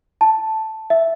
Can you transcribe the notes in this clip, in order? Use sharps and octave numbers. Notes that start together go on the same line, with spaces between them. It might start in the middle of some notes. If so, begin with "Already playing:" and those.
A5
E5